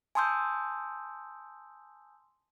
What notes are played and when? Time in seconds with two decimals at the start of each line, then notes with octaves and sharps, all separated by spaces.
0.15 G#5 A5 C6 D#6 E6 G6